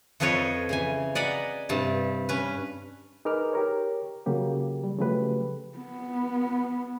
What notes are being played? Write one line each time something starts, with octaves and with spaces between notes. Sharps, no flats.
F2 F3 A4 B4 C#5 D#5
C#3 E3 G#5
D5 D#5 F#5 G#5 A#5 B5
G2 C3 A5
C#4 B4
D#4 G#4 A#4 B4 D6 F6
G4 A#4 C#5
C#3 F#3 A#3 G4
G3
C#3 F3 F#3 A3 G4 B4
B3